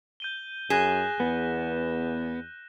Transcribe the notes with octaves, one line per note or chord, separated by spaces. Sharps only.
G6 D#7 G7
F#2 G#4 F#6 A#6 E7
E2 B3